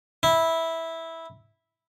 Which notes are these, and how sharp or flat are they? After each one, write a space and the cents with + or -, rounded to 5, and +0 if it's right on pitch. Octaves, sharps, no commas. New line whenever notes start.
E4 -10